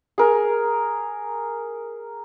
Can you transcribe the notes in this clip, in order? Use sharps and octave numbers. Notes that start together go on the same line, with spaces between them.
G#4 A#4